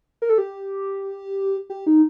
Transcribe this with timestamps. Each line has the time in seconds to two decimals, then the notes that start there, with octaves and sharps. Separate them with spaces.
0.22 A#4
0.30 A4
0.38 G4
1.70 G4
1.86 D#4